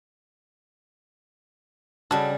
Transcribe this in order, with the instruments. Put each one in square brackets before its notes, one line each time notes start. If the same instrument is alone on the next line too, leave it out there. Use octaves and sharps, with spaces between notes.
[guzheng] C#3 G3 [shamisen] F#4 A4